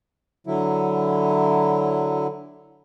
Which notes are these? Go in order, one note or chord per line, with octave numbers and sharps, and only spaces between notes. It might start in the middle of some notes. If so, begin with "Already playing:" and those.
D3 F#3 E4